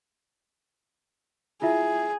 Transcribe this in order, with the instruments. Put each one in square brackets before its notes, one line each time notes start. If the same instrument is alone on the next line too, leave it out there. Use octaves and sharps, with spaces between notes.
[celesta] E4 F4 E5 [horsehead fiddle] G#4